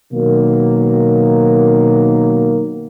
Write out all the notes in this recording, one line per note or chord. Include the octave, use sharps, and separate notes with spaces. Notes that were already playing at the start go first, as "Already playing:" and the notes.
B2 D#3 F#3 A#3